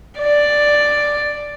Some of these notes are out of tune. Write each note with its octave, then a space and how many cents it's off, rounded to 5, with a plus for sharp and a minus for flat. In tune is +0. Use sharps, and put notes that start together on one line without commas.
D5 +5